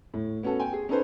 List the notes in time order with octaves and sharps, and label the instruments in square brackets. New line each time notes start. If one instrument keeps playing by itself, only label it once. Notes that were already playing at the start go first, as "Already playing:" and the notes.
[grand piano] A2
B3 C#4 F#4 A4
G5 G#5
G#4
C#4 D#4 A4 B4 C5